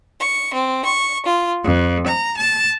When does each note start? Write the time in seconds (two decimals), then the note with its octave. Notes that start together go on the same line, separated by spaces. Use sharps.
0.20 C#6
0.53 C4
0.84 C#6
1.25 F4
1.64 F2
2.06 A#5
2.37 A5